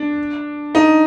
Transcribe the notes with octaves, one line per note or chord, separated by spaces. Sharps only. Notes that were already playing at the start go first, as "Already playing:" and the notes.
Already playing: D4
D#4